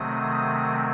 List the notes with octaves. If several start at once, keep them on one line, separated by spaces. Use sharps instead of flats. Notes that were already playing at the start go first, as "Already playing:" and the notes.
Already playing: C3 D#3 F#3 A3 C4 D#6
D#6